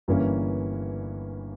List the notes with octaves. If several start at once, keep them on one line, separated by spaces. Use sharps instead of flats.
G1 G2 E3 A#3 C#4